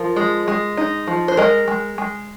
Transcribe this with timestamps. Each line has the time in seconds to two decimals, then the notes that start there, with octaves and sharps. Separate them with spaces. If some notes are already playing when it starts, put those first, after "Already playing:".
Already playing: F3 F4 A#4
0.16 G#3
0.48 G#3
0.77 D#4
1.07 F3
1.28 C5
1.37 G#3 A#4 D#5
1.68 G#3
1.98 G#3